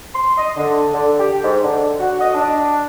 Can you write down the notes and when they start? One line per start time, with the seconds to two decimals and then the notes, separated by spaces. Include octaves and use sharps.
0.14 C6
0.38 D#5
0.56 D3
0.93 D3
1.18 G4
1.42 G#2
1.63 D3
1.99 F#4
2.20 D#5
2.35 D4